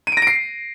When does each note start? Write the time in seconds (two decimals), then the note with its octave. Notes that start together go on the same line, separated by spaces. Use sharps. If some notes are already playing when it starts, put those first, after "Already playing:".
0.07 D#7
0.12 D7
0.17 A#6
0.22 D7
0.27 C7